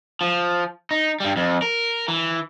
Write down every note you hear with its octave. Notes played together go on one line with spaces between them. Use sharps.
F3
D#4
G2 G3
F2
A#4
E3